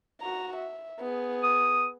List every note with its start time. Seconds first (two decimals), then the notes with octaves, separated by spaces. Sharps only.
0.21 F#4 A#5
0.56 E5
0.99 B3 G#4
1.43 D#6